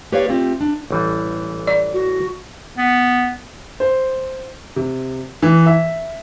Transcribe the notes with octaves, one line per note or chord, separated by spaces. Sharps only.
A#3 G4 B4 C#5 D5 F5
A3 C4 F4 G4
D4
A1 E3 G3
D5
F#4
B3
C5
C3
E3
E5